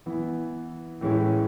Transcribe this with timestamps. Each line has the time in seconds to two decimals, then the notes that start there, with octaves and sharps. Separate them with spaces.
0.06 E3 B3 E4
1.01 A2 E3 G#3 C#4 E4